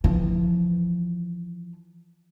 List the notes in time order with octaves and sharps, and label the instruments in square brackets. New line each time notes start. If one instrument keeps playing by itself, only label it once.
[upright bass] E3 F3